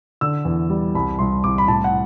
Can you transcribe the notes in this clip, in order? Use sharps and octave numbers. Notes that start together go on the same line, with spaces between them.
D3 E6
E2
G3
C2 B5
C2 C6
C2 D6
B5
A2 A5
F#5